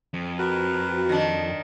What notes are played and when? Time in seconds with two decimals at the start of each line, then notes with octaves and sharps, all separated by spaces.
0.14 F2
0.39 F#4 A#4 B4
1.09 D#3 D4